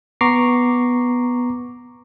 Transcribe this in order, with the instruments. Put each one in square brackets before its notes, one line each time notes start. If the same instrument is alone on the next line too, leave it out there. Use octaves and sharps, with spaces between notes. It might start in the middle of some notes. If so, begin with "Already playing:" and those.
[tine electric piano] B3 A#5 C#6 D6 C7